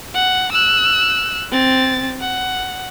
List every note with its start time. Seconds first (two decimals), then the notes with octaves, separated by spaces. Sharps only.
0.14 F#5
0.52 E6 F#6
1.51 C4 A6
2.21 F#5